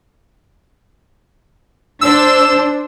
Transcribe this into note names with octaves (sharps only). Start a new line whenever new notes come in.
D4 C5 E6